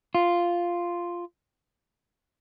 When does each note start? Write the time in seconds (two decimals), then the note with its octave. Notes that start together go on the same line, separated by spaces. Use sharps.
0.15 F4